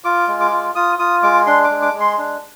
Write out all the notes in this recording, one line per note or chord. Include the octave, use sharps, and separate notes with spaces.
F4 D6
G#3
D6
F4
F4 D#6
F4 D#6
G#3 D6
D4 C6
D6
G#3
D6
G#3
C6
D4